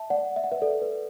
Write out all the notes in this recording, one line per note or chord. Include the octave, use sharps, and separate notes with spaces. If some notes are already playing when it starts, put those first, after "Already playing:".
Already playing: E5 A5
D5 F#5
E5
F#5
B4 E5
A4 D5
B4